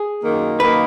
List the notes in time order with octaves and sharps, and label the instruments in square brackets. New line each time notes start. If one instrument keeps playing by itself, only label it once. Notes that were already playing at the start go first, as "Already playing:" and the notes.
Already playing: [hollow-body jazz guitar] G#4
[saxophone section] F#2 D#3 A#3
[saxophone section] F#2 D#3 A#3 [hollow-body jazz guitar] B4